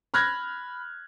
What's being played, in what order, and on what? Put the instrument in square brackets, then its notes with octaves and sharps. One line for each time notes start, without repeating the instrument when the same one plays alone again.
[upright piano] B5 F6 F#6 G#6 A#6